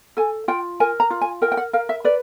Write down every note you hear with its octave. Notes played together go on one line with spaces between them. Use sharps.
A4 G#5
F4 G5
A#4 G#5
A#5
F4
G#5
A#4 G5
G5
F#5
A#4 F5
E5
B4 D5